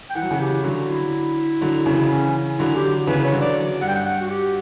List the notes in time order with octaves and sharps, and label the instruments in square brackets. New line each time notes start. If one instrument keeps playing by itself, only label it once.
[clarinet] G5
[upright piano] E3 [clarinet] F#5
[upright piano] F#3
C#3 E3
[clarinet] G4
[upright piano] D3 F#3 [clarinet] F#4
[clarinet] E4
[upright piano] D3 F#3
C#3 E3
[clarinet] C#4
[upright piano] D3 F#3 [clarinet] E4
[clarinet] G4
[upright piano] C#3 E3 [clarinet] B4
[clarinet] C#5
[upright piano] D3 F#3
[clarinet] D5
[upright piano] G2 [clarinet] F#5
[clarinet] G5
F#5
F#5
F#4
G4